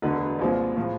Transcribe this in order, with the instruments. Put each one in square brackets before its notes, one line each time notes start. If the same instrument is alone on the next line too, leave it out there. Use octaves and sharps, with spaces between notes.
[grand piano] E1 D2 D3 B3 B4
C2 A#2 F3 G#3 C4
A2 F3 G#3